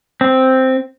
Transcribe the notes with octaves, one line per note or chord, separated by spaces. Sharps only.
C4